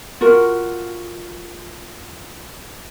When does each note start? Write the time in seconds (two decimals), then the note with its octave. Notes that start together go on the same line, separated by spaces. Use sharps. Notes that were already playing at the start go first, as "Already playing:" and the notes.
0.21 F4 F#4 A#4